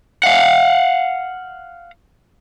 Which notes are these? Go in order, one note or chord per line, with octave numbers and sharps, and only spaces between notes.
F5 F#5